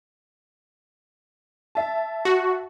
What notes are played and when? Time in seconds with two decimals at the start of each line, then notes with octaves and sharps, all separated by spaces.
1.75 E5 A5
2.25 F#4